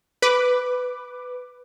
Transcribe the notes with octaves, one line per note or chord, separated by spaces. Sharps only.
B4 D6